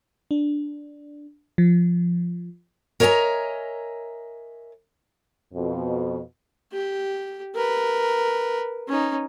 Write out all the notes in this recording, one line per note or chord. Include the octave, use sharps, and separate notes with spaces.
D4
F3
A#4 C#5 D#5 E5 G#5 A#5
F2 B2
G4
A#4 B4
C#4 D#4